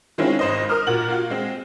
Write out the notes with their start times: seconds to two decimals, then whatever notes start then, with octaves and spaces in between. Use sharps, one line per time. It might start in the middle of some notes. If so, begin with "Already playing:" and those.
0.18 D#3 G#3 C4 C#4 E4 F4
0.39 G#1 C5 D#5
0.70 A#4 D#6 F6
0.87 A#2 F#4 F#7
1.08 A#3 F4 F#4
1.30 G#3 C4